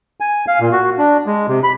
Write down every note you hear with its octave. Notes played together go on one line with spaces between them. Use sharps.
G#5
F5
A#2
F#4
D4
G#3
C3
B5